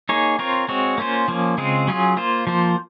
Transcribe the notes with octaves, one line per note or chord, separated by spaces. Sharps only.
A#3 D#4 G#4 C#5
C4 F4 A#4 C#5
G#3 C4 F#4 C#5
A#3 C#4 F4 C5
F3 A#3 C#4
C#3 G#3 C4 F4 G#4
F#3 C#4 F4 G#4
A#3 F4 C5
F3 A#3 F4 C5